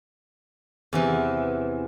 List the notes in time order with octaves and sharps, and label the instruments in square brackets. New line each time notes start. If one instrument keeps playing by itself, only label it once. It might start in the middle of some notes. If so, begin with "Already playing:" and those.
[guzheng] E2 C3 E3